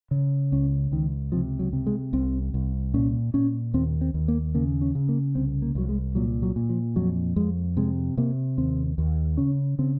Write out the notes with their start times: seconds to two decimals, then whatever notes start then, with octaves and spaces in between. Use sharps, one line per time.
0.11 C#3
0.52 C#2 C#4
0.92 C#2 D#3
1.32 C3 F3
1.59 F#3
1.73 C3
1.87 G#3
2.13 C2 C4
2.54 C2
2.94 A#2 C#4
3.34 A#2 C#4
3.74 D#2 C4
4.01 C4
4.14 D#2
4.28 A#3
4.55 C#3 A#3
4.82 C#4
4.95 C#3
5.09 A#3
5.35 C2 C4
5.62 A#3
5.75 C2 F#3
5.89 G#3
6.15 A#2 F#3
6.42 F#3
6.56 A#2
6.69 F3
6.96 F2 F#3
7.36 F2 G#3
7.77 C3 G#3
8.17 C3 A#3
8.58 D#2 C4
8.98 D#2
9.37 C#3 C#4
9.79 C#3 C4